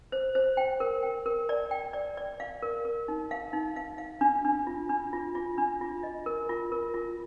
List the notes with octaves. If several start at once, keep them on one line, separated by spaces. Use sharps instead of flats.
C5
C5
G5
A#4
G5
A#4
D5
G5
D5
D5
F5
A#4
A#4
D#4
F5
D#4
F5
F5
D4
D4
F4
D4
F4
F4
D4
F4
D#5
A#4
F4
A#4
F4